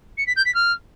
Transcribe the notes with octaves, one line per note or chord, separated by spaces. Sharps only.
C#7
B6
G6
B6
F6